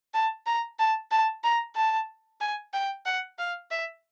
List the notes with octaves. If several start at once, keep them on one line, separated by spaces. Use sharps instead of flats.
A5
A#5
A5
A5
A#5
A5
G#5
G5
F#5
F5
E5